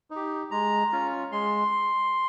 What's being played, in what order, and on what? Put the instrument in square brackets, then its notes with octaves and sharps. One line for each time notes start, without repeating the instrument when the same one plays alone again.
[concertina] D#4
G4
G#3 A#5
C#4 F4
G#3 C6